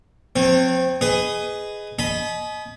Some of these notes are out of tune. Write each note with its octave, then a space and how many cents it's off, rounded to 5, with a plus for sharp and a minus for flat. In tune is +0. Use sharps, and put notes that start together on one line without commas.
F3 +40 C4 -10 C#5 -35
G#4 +0 B4 +20 D#5 +0
D#5 +0 G#5 +45 B5 +0